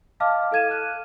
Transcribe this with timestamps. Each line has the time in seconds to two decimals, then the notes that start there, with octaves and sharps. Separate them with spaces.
0.20 D#5 F5 A5 D6 F6
0.51 E4 A4 F5 G#6 D#7 E7
0.70 F6 F#6 D#7